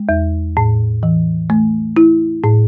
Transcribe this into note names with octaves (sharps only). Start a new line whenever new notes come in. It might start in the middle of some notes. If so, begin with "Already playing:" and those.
Already playing: G#3
E2
A2
E3
A3
E4
A2